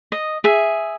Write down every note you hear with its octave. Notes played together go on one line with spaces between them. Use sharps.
D#5
G#4 E5